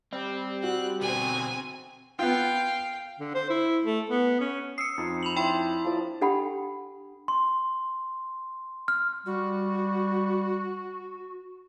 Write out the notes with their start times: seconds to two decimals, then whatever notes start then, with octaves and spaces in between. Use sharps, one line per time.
0.13 G3 C4
0.63 F#4 F#6
1.01 B2 D3 C4 G#5
2.19 B3 F4 F5 G5
3.20 D3
3.35 C5
3.50 E4
3.85 A3
4.10 B3
4.40 C#4
4.78 D#6 E6 C7 C#7
4.98 F2 D#4 F4
5.23 B5 F7 F#7
5.36 D4 E4 G5 B5 C6
5.85 F3 A#3 D5
6.21 D4 G4 A4 F#5 G5 B5
7.28 C6
8.88 F6
9.26 G3 F#4